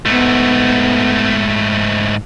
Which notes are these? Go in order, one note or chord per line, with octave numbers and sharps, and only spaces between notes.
G#2 A3 B3